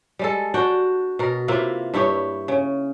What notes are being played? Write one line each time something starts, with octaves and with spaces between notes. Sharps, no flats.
G3 G#3 A4
D4 F#4 G5
B2 A#4
C3 A#3 E4 F4
G2 E4 G4 C#5
C#3